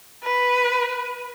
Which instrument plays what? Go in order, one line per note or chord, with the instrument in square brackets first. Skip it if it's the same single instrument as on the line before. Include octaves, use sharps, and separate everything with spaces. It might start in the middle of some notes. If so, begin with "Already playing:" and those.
[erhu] B4